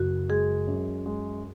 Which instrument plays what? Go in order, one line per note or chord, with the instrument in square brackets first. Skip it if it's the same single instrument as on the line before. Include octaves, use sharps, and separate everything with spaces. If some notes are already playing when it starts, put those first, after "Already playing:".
Already playing: [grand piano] F#1 [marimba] F#4
[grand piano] G#3 [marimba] G#4
[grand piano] F#2
G#3